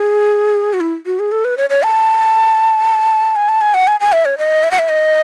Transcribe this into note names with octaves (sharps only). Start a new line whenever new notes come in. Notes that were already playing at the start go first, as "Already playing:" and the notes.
Already playing: G#4
F#4
E4
F#4
G#4
A4
B4
C#5
C#5
A5
G#5
A5
G#5
F#5
G#5
G#5
E5
C#5
D#5
E5
F#5
E5
D#5